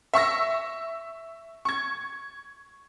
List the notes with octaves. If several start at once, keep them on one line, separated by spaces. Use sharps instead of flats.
E5 C#6 E6 A#6
C#6 G#6